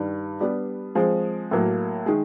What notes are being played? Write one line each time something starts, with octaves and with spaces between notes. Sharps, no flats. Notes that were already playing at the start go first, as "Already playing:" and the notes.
Already playing: G2 D#3 G3
G3 B3 D4 G4
F3 G#3 C4
A2 F#3 A#3
D#3 G#3